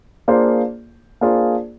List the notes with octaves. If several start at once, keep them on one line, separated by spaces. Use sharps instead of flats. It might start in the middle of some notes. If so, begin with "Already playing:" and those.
A#3 D4 F4 G#4 C5
A#3 D4 F4 G#4 C5